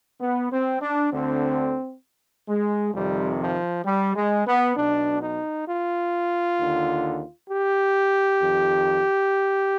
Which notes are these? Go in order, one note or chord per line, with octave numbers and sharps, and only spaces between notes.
B3
C4
D4
D2 D3 C4
G#3
F2 C3 D#3 G3
F3
G3
G#3
B3
B1 B2 D4
D#4
F4
D#2 D3
G4
F2 D#3